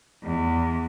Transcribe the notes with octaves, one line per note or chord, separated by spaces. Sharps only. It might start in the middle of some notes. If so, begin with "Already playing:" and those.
E2